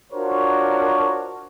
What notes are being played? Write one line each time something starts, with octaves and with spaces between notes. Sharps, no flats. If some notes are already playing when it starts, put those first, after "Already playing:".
D4 F4 F#4 A#4 C5 C#5